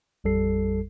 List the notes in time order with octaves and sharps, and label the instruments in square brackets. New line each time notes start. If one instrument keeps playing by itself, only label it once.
[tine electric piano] A1 F2 G3 A4 C7